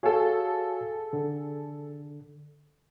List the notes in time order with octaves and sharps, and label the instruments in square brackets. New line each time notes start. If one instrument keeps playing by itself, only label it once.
[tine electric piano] F#4 C#5 F5 [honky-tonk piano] G#4 A4
[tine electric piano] D3